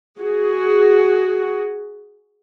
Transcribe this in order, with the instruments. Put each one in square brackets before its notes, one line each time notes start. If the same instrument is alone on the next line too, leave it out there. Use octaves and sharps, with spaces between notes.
[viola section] F#4 G#4